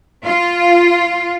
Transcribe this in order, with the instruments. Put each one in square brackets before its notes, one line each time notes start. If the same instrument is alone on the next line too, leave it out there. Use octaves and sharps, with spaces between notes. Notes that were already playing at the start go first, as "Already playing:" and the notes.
[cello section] F4